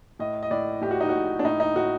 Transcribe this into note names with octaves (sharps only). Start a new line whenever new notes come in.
A2 D#5
D#5
A2 D5
A2 G4
F#4
D#4
A2 F#4
D4
A2 D#4
D#4
A2 F#4